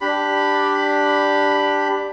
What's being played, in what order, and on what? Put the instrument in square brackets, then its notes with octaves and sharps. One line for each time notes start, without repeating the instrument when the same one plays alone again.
[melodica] D4 G4 B5